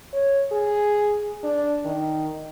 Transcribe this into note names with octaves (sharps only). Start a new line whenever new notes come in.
C#5
G#4
D4
D#3